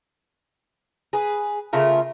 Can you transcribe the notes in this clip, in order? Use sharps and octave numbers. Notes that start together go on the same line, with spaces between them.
G#4 B4
C#3 A3 F4 A#4